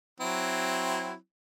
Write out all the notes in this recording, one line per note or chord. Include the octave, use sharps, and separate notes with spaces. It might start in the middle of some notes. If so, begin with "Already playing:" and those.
F#3 C4 E4